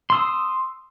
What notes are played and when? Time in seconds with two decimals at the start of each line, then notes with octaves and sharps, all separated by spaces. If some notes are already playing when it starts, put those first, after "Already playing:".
0.10 C6
0.12 E6
0.15 D#6